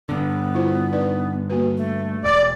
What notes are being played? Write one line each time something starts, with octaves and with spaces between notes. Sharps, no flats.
G2 D3 B3
E4 F4 C5
D#4 B4 D5
A#3 F#4 B4
A3
E1 D5